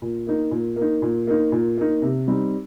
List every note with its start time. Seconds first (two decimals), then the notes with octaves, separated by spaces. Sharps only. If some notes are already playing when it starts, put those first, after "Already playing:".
0.02 A#2
0.27 A#3 D#4
0.51 A#2
0.76 A#3
0.81 D#4
1.02 A#2
1.27 A#3 D#4
1.52 A#2
1.77 A#3 D#4
2.02 C3
2.28 G3 C4 D#4